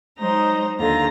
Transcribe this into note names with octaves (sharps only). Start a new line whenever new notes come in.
F#3 G#3 D#4 C5 A#5
D#2 D3 F4 A#5